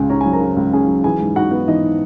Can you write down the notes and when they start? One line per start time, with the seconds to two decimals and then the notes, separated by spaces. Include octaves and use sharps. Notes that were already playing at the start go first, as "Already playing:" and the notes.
Already playing: C#2 C#3 G#4 G#5
0.10 C#4 A#5
0.21 F#3 G#5
0.33 A#4 A#5
0.41 C#3
0.57 C#2
0.73 C#4 G#4 G#5
0.88 F#3
1.04 E3 G#4 G#5
1.20 G#2
1.36 D#4 F#4 F#5
1.51 B3
1.68 E3 D#4 D#5